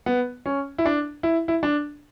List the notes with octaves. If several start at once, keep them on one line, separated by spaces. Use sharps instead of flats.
B3
C#4
E4
D4
E4
E4
D4